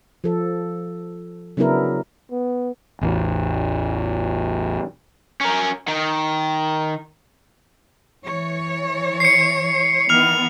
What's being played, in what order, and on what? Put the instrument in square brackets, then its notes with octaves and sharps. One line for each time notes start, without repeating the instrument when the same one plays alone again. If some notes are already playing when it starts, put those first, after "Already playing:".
[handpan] F3 A4
C#3 F#3 B3 D4 E4 A#4
[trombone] B3
[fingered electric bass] A1 E2
[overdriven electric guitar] C#4 A#4
D#3
[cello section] E3 C#5
[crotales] C7 C#7
[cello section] D#3 E3 B3 [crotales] F6 F7